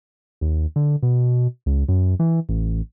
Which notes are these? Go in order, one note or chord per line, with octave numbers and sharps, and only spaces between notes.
D#2
D3
B2
C#2
F#2
E3
A1